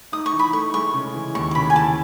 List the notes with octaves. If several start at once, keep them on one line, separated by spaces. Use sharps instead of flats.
D#4 D#6
C#6
E3
B5
A3 C#6
G#3 C#6
C#3
E3
D#2 C#6
C#6
C#3 B5
G#5
E3 A5